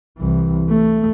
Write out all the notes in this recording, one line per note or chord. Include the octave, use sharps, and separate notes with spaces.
C2 E3
A3